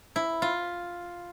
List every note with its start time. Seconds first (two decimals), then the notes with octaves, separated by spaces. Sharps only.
0.16 E4
0.42 F4